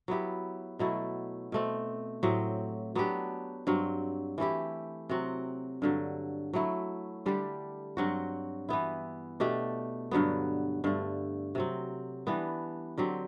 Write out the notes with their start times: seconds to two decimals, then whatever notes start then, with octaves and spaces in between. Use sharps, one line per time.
0.08 F#3 B3 E4 G4
0.79 B2 F#3 A3 E4
1.52 B2 A3 C4
2.23 A2 F#3 C4 G4
2.95 F#3 B3 D4 G4
3.67 G2 F#3 C4
4.38 E3 A3 E4 G4
5.09 C3 F#3 C4 F#4
5.82 G2 D3 F#3
6.53 F#3 A3 E4
7.26 D3 G3 D4 G4
7.97 G2 F#3 C4 F#4
8.69 E3 B3 E4
9.40 B2 A3 D4 G4
10.11 G2 D3 F#3 B3
10.84 G2 D3 A3
11.55 C3 F#3 C4
12.27 E3 G3 B3 D4
12.97 D3 F#3 C4 G4